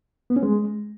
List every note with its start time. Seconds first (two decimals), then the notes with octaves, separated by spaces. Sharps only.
0.30 B3
0.36 C#4
0.43 G#3